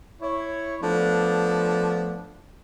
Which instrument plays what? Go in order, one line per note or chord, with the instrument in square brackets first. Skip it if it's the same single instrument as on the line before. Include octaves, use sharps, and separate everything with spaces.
[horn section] E4 C#5
F3 A3 B3 D4